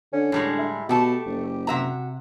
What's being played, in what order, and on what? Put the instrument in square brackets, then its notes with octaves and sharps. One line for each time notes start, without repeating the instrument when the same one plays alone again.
[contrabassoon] D3 [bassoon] C#4
[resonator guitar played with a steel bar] A2 G3 G#3 [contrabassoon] D3
[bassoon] E4
[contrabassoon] B2 [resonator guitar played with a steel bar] A3 A4 A5 [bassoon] G4
[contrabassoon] F#1
[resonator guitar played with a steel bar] C3 E5 A#5 [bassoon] F#4